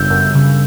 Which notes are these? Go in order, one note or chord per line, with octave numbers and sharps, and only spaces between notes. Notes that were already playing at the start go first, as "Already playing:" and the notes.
Already playing: G1 F#2 C#3 G3 E6 G6
F#2
C#3